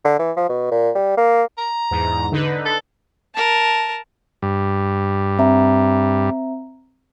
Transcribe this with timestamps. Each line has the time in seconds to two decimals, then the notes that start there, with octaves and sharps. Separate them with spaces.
0.04 D3
0.19 E3
0.37 F3
0.49 B2
0.71 A#2
0.95 G3
1.17 A#3
1.58 A#5
1.91 E2 G#2
2.32 D3 D#4 B4
2.65 A4
3.35 A#4 A5
4.42 G2
5.39 C4 E5 A#5